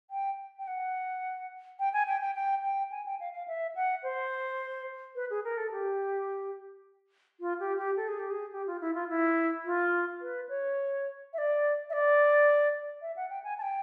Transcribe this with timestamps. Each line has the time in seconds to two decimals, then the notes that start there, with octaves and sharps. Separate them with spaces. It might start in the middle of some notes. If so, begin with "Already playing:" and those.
0.10 G5
0.59 G5
0.67 F#5
1.79 G5
1.93 G#5
2.07 G5
2.21 G5
2.35 G5
2.63 G5
2.91 G#5
3.06 G5
3.20 F5
3.33 F5
3.48 E5
3.75 F#5
4.03 C5
5.15 B4
5.30 G#4
5.44 A#4
5.57 A4
5.72 G4
7.40 F4
7.60 G4
7.78 G4
7.97 A4
8.08 G#4
8.19 G4
8.31 G#4
8.52 G4
8.67 F4
8.81 E4
8.94 F4
9.09 E4
9.65 F4
10.21 B4
10.49 C#5
11.33 E5
11.38 D5
11.89 E5
11.93 D5
13.02 E5
13.16 F#5
13.30 G5
13.44 G#5
13.58 A5
13.62 G5